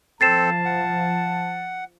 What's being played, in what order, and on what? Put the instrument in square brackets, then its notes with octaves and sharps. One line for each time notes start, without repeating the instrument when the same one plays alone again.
[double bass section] F3 [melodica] C4 A4 [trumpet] A5 [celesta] A6 C7 E7
[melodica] F#5